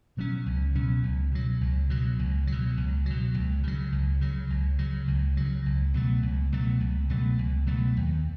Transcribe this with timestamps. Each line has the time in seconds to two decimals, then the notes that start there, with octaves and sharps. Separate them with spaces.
0.17 B2 F#3 C#4
0.46 C#2
0.75 B2 F#3 C#4
1.03 C#2
1.32 B2 F#3
1.61 C#2
1.90 B2 F#3
2.19 C#2
2.47 B2 F#3
2.77 C#2
3.06 B2 F#3
3.34 C#2
3.63 C#3 F#3
3.92 C#2
4.21 C#3 F#3
4.50 C#2
4.79 C#3 F#3
5.08 C#2
5.37 C#3 F#3
5.66 C#2
5.94 B2 F#3 A3
6.22 C#2
6.52 B2 F#3 A3
6.80 C#2
7.10 B2 F#3 A3
7.38 C#2
7.67 B2 F#3 A3
7.97 D#2